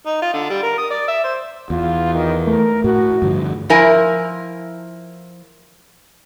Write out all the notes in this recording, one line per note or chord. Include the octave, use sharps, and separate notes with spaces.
D#4
F4
D3
G3
A#4
D#6
D5
E5
C5
E2 F4
D#3
A3 A#4
A2 F#4
G2 D3 F3
F3 E4 A#4 G#5